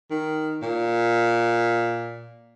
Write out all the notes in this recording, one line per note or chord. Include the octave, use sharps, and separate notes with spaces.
D#3
A#2